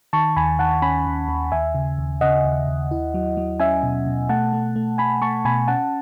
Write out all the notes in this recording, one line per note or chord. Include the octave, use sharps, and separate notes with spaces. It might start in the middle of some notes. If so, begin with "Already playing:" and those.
D#3 A5 C#6
D#2 G#5 B5
D#3 F#5 A5
C#4 G#5 B5
D#2
D#2
D#2 E5 G#5
C#3
D#2
C#3 D#5 F#5
D#2
D#2
E4
F#3
F#3
C#4 E5 G#5
B2
B2
A3 F#5 A5
A3
A3
A3 G#5 B5
A3 A5 C#6
B2 G#5 B5
C#4 F#5 A5